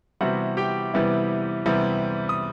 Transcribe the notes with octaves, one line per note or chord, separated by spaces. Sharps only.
C3 E3 G3 B3 E4 F#4 F#5
G4 G5
C3 E3 G3 B3 E4
C3 E3 G3 B3 E4
D#6